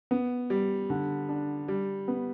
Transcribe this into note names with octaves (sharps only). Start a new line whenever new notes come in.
B3
G3
D3
D4
G3
B3